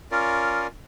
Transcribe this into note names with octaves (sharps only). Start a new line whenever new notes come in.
C#4 F4 A#4 D5